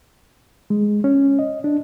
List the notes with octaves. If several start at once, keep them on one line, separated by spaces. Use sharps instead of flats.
G#3
C#4
D#5
D4